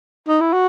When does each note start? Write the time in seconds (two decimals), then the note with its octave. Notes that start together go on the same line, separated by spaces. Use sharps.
0.28 D#4
0.41 E4
0.53 F#4